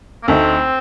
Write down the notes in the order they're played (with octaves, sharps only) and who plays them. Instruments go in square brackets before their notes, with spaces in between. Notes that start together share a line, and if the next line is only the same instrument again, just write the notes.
[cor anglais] A#3
[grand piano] D2 D3 A3 D#4 [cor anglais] C4